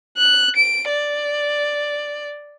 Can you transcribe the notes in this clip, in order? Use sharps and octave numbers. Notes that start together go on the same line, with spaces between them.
F#6
D7
D5